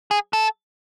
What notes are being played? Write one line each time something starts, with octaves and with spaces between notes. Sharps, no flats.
G#4
A4